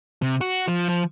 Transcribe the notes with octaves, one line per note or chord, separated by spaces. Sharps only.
C3
F#4
F3
F3